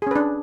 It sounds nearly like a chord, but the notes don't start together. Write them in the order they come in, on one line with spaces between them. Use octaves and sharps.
G#4 C#4 B4 D4